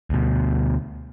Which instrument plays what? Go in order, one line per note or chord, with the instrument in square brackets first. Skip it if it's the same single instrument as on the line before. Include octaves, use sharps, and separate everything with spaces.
[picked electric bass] D2 B2